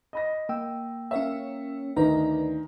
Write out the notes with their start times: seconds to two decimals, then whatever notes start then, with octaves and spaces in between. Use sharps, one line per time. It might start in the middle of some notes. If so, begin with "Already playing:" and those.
0.13 D#5 B5 A#6
0.49 A#3 G5 E6
1.11 C#4 A#4 C#5 E5 F5
1.96 D2 D#3 A#4 B4 D5 D#5 A#5